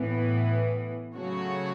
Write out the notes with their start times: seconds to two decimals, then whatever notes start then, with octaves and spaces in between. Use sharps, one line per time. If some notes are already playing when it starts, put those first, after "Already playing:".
Already playing: A2 E3 B3
1.13 C#3 F#3 A3 F#4 C#5